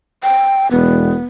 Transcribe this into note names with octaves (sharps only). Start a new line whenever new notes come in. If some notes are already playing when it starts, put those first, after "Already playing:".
G5
E1 B3